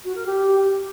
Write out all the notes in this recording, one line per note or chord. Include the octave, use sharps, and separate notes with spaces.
F#4
A#4
G4